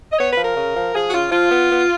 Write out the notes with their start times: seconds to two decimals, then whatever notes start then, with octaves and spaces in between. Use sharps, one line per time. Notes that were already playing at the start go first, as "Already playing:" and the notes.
0.11 D#5
0.19 B3 C#5
0.32 B4
0.37 F3
0.43 A#4
0.56 C#3
0.75 F3
0.94 F3 G#4
1.08 F#4
1.13 C#3 F4
1.31 F3 F4
1.50 B3
1.70 B3